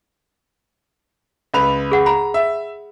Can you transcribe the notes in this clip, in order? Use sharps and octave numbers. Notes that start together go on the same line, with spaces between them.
C#2 B4 F7
G#4 F#5
A#5 B5
E5